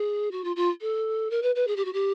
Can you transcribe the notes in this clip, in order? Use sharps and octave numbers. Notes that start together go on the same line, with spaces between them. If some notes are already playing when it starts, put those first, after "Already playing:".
Already playing: G#4
F#4
F4
F4
A4
A#4
B4
B4
G#4
G4
F#4
G4